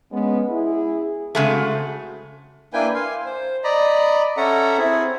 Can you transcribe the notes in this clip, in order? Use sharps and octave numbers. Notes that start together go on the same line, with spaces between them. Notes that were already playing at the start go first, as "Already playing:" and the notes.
G#3 B3 C#4
E4 G#4
C#3 G#3 A3 C4 F#4
A#3 D4 E4 B4 G5 G#5
F5 G#5 C6
C5
D5 D#5 A#5 B5
C#4 A4 E5 F#5 A#5
C4 E4 G#4